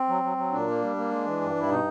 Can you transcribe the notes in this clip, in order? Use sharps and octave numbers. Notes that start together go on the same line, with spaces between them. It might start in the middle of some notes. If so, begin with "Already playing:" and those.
Already playing: C4
F#3
F#3
F#3
A#2 D4
A#3
G3
A#3
G#3
E3
G2
G2 E4
B2 D#4